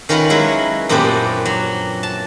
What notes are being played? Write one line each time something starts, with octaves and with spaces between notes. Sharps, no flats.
D#3 C#4 F4 A#4 B4 F#5
F#3 G#3 E4 B4
F#2 A#2 B3 C4 D4 G4
F#3
A5